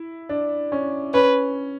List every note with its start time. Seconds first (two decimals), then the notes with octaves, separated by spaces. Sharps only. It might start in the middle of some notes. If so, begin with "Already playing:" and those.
Already playing: E4
0.29 D4
0.72 C#4
1.14 C#4 B4